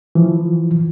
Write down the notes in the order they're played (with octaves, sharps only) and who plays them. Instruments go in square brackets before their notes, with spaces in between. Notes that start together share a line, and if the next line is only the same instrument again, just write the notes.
[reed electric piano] E3 F3